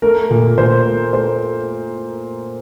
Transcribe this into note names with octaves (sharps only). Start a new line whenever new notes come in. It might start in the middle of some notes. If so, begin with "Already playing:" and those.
A3 A#4
A#2
A#2 C5
A3
A3 C5